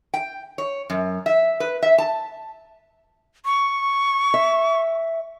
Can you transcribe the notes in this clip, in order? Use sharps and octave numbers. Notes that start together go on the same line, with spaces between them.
G5
C#5
F#2
E5
B4
E5
A5
C#6
E5